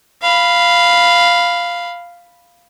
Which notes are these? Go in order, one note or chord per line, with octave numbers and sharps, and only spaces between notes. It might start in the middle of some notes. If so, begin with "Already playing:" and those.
F5 B5